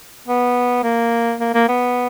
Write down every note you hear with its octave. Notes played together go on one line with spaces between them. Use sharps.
B3
A#3
A#3
A#3
B3